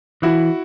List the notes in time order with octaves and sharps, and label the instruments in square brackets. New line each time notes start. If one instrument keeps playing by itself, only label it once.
[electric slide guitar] E3 [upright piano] E4 F#4